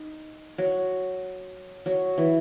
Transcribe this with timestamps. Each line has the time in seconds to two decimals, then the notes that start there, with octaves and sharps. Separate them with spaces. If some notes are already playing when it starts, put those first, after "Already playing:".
Already playing: D#4
0.58 F#3
1.86 F#3
2.18 E3